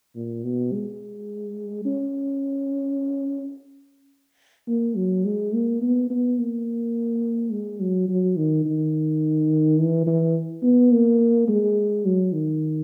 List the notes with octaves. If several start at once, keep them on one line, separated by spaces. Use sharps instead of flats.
A#2
B2
G#3
C#4
A#3
F#3
G#3
A#3
B3
B3
A#3
G#3
F#3
F#3
D#3
D#3
E3
E3
B3
A#3
G#3
F#3
D#3